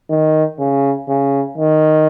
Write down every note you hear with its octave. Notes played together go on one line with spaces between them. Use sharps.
D#3
C#3
C#3
D#3